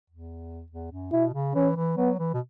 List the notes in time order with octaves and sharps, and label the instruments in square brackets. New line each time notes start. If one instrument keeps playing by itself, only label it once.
[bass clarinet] E2
E2
F#2
[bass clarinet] B2 [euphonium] E4
[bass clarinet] C#3
[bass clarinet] E3 [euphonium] C#4
[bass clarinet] E3
[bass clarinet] F#3 [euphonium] B3
[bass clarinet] E3
B2